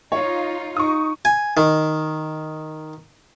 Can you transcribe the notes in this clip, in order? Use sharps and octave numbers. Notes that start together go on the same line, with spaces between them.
D#4 F4 C#5
D#4 C#6 D#6
G#5
D#3